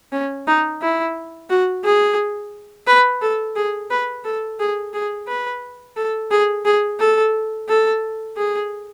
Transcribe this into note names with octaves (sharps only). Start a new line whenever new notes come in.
C#4
D#4
E4
F#4
G#4
B4
A4
G#4
B4
A4
G#4
G#4
B4
A4
G#4
G#4
A4
A4
G#4